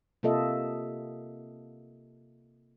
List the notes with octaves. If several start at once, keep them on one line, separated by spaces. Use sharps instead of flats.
C3 A#3 F4 A4 D#5 E5